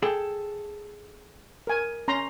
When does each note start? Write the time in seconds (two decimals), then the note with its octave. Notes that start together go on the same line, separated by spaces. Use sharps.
0.02 G#4 A4 G5
1.67 A#4 G#5
2.08 C#4 A#5 C6